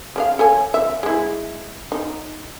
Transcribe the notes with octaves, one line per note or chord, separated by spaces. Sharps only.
C#3 D4 F5
A4 C#5 G#5
E5
G#3 E4
D#4